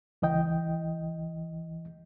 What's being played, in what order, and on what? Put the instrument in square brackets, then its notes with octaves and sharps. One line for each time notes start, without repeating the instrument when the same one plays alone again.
[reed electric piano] C#2 E3 D#5 G5